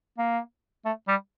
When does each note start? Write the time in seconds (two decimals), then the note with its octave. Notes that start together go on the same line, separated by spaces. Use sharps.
0.18 A#3
0.85 A3
1.08 G3